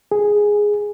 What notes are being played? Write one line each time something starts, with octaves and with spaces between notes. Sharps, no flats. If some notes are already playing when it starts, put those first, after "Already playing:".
G#4